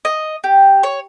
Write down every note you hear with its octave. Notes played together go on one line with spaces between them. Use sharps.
D#5
G4
C#5